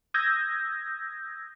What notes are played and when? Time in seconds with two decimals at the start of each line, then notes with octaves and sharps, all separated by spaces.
0.14 D#6 E6 G6 G#6 A#6